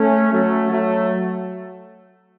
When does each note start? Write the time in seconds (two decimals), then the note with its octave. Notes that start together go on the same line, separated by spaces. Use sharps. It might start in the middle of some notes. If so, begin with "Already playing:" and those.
Already playing: A3 C#4
0.32 F#3 A3
0.71 F#3 A3